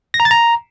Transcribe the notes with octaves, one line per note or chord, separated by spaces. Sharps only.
A#6
A#5
A6
A#5